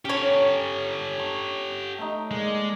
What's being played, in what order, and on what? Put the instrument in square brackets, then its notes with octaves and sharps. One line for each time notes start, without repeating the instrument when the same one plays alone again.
[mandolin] C#4 C#5 [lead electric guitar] G4 A4
[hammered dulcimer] C#6
A3 D#4
[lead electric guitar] G#3 [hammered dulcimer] A#3 D5